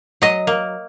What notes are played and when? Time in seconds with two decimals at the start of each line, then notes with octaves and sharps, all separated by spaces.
0.22 F#3 D#5
0.47 A#3